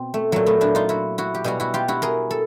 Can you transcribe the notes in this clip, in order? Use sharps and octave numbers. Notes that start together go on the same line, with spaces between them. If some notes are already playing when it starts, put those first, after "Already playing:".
Already playing: B2 C4
A3
A#2 F#3 A3
A3 B3
D4 E4
D#4 F4
E4 F#4
E4 F#4
G4
B2 G3 F#4 G#4
E4 F#4
F4 G4
E4 F#4
G#4 A#4
A4